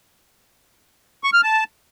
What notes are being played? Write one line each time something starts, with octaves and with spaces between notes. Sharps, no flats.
C#6
F6
A5